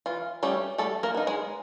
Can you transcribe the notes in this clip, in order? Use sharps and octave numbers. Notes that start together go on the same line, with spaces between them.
E3 F4
G3 A3 C#4 G4
G3 A3 A4
A#3 A#4
B3 D#4
G#3 G#4